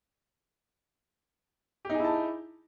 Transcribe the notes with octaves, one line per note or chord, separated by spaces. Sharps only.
D#4 E4 G4 G#4 A5